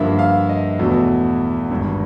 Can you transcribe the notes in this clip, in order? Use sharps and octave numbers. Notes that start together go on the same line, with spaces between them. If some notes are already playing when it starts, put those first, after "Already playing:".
Already playing: G2 D3 F3 A#3 E5
F5
D#5
E2 B2 F#3 A3
G#1 G2 D3